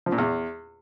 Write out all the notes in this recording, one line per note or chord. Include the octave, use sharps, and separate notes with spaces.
F3
A#2
E2